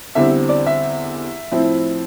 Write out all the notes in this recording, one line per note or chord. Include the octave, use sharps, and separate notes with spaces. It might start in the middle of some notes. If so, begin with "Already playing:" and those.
E2 D3 G3 C4 E5
D5
E5
A2 F3 C4 E4